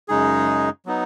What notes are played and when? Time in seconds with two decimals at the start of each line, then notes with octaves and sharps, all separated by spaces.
0.08 F#2 C#3 G#3 D#4 G#4
0.86 F#3 B3 D#4